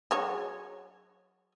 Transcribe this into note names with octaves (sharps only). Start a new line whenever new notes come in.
F#3 G#4 C#5